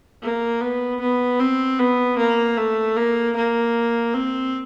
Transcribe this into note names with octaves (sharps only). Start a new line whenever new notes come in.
A#3
B3
B3
C4
B3
A#3
A3
A#3
A#3
C4